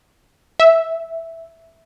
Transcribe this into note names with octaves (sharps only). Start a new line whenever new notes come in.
E5